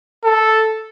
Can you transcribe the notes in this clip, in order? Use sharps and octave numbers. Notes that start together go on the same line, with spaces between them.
A4